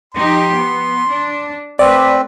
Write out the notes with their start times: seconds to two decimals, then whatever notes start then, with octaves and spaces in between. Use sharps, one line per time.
0.14 F3 D#4 G4 C6
0.54 B3
1.07 D4
1.79 A3 C4 B4 D5